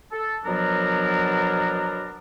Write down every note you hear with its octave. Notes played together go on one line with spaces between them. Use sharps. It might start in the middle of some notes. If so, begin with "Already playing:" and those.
A4
B2 F3 F#3 B3 D4 A#4